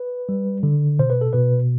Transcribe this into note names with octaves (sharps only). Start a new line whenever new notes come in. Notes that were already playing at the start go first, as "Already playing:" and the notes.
Already playing: B4
G3
D3
B2 C5
B4
A4
B2 B4